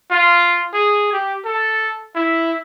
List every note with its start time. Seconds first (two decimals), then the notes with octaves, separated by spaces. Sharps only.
0.11 F4
0.73 G#4
1.13 G4
1.45 A4
2.15 E4